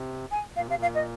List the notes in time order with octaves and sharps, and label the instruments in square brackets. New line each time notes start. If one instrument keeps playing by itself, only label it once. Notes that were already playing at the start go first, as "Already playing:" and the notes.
Already playing: [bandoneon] C3
[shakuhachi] G#5
[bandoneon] A#2 [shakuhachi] F5
[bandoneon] C3 [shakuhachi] F5
[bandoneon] A#2
[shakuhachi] F5
D#5